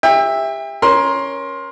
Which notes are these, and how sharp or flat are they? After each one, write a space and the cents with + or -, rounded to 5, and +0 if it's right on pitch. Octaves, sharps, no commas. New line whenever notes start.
G4 +30 E5 +0 G5 +35
C#4 +0 A#4 +25 C6 +10